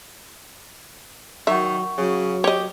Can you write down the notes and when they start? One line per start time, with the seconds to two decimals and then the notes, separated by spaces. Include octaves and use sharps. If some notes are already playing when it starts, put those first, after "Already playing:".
1.47 D#3 F#3 E5 F#5 C#6
1.98 C#3 F#3
2.44 G4 C#5 D#5